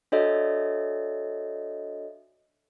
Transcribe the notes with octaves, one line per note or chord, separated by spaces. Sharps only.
D4 F#4 A4 C#5 D#5 E5